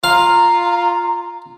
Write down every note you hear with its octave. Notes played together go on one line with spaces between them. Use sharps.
F4 F5 A#5